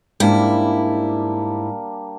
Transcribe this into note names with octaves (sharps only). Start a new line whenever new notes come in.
G#2 G3 A#3 D4 E4